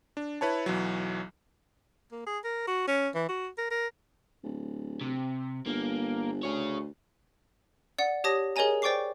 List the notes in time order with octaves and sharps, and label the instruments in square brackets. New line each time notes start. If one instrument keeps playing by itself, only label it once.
[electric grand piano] D4
E4 B4 C#5 A5
B1 E3 F#3
[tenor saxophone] A#3
G#4
A#4
F#4
C#4
E3
F#4
A#4
A#4
[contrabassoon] D1
[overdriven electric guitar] C3
[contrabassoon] G1 [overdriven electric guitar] A#3
[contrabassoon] D2 [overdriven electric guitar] G#4 C#5
[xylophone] D5 F#5
G4 C#5 A5 D#6 A#6
G#4 A#4 C#5 D#5 G#5 A#5
C5 D5 G5 C#6 D6 C7